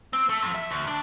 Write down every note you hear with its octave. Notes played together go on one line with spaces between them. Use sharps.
C4
A3
F2
E5
D2
D4